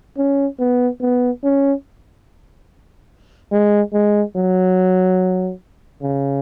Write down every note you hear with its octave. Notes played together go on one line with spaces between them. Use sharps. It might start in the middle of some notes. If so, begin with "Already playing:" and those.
C#4
B3
B3
C#4
G#3
G#3
F#3
C#3